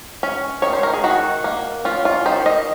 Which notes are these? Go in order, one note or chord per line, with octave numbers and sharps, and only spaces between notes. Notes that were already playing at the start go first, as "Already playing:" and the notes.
C#4
D#3 C#5
C5
A#4
G#4
D#3 F#4
A#3
C#4 F4
F4
D#3 C5
D#5